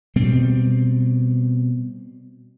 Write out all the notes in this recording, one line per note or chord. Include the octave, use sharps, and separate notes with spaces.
B2 G3 C4